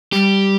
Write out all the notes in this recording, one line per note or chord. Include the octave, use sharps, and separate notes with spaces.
G3 G4